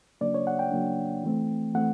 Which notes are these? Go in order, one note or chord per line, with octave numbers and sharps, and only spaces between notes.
C#3 F#3 A#3 D4 D5
C#5
F#5
G5
C#3 F#3 A#3 D4
E3 A3 C4
E3 A3 C4 F#5